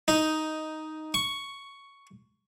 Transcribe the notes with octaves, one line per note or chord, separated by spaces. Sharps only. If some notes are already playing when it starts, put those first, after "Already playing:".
D#4
C#6